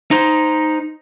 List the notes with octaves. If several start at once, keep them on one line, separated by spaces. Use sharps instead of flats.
D#4 C5